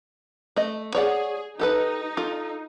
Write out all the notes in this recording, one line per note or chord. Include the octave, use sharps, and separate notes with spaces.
A3 D#5
G#4 C#5 D5 F#5
D#4 G4 A4 B4
F4 A4